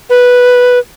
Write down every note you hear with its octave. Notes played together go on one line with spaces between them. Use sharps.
B4